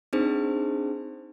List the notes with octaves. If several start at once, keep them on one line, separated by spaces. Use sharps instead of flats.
C4 D4 D#4 G#4 C5